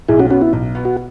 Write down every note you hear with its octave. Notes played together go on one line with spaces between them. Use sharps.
B1 E4 G#4
C#4 F#4
B2 B3 C#4 F#4
E4
B1
B2 B3
F#4